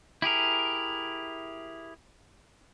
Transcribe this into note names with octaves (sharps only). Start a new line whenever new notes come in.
E4 G4 G#4 A#4